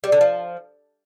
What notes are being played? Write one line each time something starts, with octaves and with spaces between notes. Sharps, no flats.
G3
D3
F3